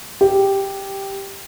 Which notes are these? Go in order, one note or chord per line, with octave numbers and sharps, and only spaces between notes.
G4